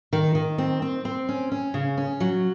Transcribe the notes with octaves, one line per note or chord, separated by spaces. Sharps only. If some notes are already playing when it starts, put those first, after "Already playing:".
D#3
D#3
C4
C4
C4
C#4
C#4
C#3
C#4
F#3